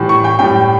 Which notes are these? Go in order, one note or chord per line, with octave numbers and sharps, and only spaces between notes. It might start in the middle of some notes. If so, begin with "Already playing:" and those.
Already playing: A2 E3 G3
C#6
G5
A2 G3 G5